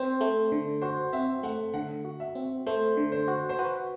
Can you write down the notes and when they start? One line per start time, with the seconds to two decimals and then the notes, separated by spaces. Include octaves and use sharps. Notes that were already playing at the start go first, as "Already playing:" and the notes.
Already playing: C4 C5
0.21 A3
0.52 D3
0.82 F#4 C5
1.13 C4 E5
1.43 A3 F#5
1.74 D3 F#5
2.05 F#4
2.20 E5
2.35 C4
2.66 A3 C5
2.97 D3
3.12 C5
3.28 F#4
3.49 C5
3.59 F#4 B4